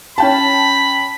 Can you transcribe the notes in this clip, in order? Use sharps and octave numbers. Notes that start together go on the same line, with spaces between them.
C#4 G5 A5 B5